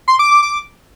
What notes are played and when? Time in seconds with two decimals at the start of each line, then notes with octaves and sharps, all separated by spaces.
0.08 C6
0.19 D6
0.31 D6
0.43 D6